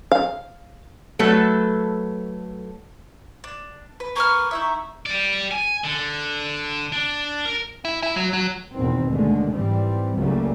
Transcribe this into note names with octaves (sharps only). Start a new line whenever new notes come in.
F5
F#3 A3 A4 B4
D4
B4
A#3 B4 C#6 F6
D#4 E4 E5
G4 D5
G#5
D3
D4
A#4
E4
E4
F#3
F#3
E2 B2 D#3 C4
D#2 D3 G#3 A3
G#2 E3 G3 C4
C#2 C#3 F#3 G3 A3 A#3